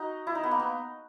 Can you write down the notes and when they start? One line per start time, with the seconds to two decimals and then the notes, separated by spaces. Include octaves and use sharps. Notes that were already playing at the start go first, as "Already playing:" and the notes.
Already playing: D#4 F#4
0.27 E4
0.35 D#4
0.43 B3
0.51 A#3
0.60 B3